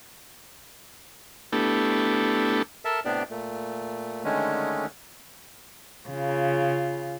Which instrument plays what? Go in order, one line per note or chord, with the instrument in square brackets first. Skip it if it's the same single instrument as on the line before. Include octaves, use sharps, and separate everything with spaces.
[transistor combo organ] A3 B3 D4 E4 G4 A4
[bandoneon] A4 A#4 E5 A5
A2 C3 B3 D4 G4 D5
A#2 A3
D3 D#3 G#3 A3 C#4
[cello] C#3 F4